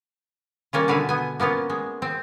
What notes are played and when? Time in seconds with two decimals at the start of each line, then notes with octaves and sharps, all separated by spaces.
0.73 G3 A#3 C#4 F4
0.88 B2 D3 B4 F5 G#5
1.09 B3 G#5
1.40 A#3 B3 C#4 F4
1.70 G#3
2.02 C4